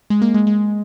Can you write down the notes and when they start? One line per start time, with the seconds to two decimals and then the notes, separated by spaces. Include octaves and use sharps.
0.10 G#3
0.22 A#3
0.34 G#3
0.47 G#3